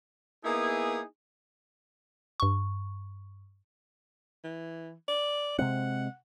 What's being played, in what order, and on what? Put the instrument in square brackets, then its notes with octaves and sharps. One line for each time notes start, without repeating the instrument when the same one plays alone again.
[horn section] A#3 B3 D#4 E4 G#4
[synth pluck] G2 C#6
[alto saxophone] E3
D5
[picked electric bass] C3 G#3 C4 [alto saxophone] F#5